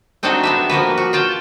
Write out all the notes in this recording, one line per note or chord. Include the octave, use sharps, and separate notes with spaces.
A3 C4 D4 D#4 F#4 A4
B3 D4 E5
F3 A#3 F#4 B4
F#4
F4 G5 A5